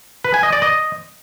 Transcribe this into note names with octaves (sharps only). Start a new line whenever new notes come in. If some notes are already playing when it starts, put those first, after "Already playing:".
B4
G#5
D#5
D5
D#5